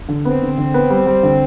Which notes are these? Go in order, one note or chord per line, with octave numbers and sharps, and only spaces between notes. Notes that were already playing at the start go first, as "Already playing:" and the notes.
D3
B3 C4
D3
D3
B3
G3
G3
D3